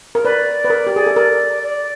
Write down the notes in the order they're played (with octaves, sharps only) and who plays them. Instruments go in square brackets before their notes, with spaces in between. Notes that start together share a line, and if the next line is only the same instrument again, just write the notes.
[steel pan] A#4
[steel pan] B4 [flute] D5
[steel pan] B4
A#4
G4
G#4
A4
A#4
[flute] D5